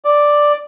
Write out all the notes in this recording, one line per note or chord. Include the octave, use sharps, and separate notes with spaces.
D5